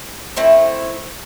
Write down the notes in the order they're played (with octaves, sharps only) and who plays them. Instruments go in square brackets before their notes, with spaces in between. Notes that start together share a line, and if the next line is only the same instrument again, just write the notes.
[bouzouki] A3 C4 E4